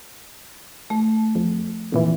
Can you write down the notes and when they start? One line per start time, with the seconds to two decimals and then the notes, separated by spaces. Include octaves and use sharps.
0.90 A3
1.35 F2
1.92 F2 A#2 E3